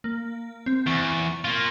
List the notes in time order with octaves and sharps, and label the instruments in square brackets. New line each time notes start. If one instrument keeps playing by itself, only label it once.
[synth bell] A#3
C4
[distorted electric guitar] E2 [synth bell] C#6
[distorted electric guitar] A#3 F4